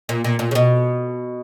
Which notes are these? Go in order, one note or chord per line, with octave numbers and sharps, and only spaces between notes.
A#2
A#2
A#2
C#3
B2